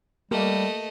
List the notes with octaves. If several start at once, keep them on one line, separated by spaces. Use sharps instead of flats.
G3 A3 A#3 G4 A#4 D#5